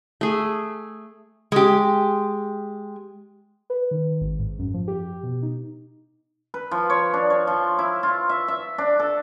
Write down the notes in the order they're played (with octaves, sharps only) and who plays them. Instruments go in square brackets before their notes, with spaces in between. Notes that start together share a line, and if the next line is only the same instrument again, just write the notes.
[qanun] A3 G#4
[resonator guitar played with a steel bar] G#3 G4
[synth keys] B4
D#3
G#1
G#2
F#2
F3
G4
B2
D#4
[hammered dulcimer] B4
F3
C#5
D4
C#5
F3
E4
F4
E5
E5
D4
A4